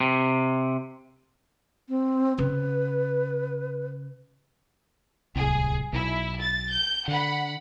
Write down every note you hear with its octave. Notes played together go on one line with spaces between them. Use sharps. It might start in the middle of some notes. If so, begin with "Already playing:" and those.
C3
C4
C#3 B4
D1 C2 G#4
B1 E4
A6
G6
D3 F#5 B5